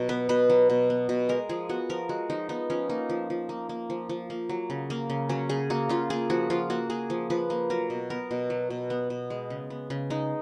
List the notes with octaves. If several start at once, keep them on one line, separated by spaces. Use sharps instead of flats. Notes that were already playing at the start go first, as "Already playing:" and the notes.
Already playing: B2 F#3
B3 B4
B2 B4
F#3
B2
B3
B2
G#3 A#4
F3 G#4
B3 F#4
F3 A#4
G#3 F#4
F3 D#4
B3 D#4
F3 C#4
A#3 D#4
F3
F3
A#3
A#3
F3
F3
A#3
F#3
C#3
A#3
C#3
F#3 C#4
C#3 G#4
A#3 F#4
C#3 F4
A#3 G#4
F3 F#4
F3 F4
A#3 F#4
A#3 G#4
F3
F3 B4
A#3
F#3 A#4
B2
B3 A#4
B2
F#3
B2
B3
B2
G#3
C#3
B3
C#3
G#3 D#4